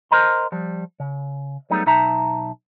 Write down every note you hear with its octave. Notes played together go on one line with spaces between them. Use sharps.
A#4 C5 D#5 A#5 C6
F3 G3
C#3
F#3 G3 A3 B3 D#4 G#4
B1 D#4 E5 A5 A#5